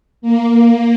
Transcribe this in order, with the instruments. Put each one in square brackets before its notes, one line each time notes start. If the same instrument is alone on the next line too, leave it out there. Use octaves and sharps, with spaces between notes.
[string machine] A#3